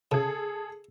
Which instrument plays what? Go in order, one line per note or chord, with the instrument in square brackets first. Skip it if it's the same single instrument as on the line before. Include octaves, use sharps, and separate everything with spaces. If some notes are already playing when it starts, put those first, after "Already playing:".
[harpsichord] C#3 [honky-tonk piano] G#4 A4